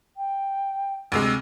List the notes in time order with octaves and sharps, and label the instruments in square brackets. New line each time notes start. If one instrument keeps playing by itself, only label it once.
[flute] G5
[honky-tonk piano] D2 C3 G#3 [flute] E6